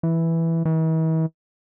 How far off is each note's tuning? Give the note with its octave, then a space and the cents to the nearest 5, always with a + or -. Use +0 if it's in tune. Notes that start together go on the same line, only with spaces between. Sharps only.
E3 +0
E3 -45